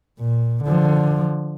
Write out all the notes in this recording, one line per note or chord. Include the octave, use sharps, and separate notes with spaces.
A#2
D3 F3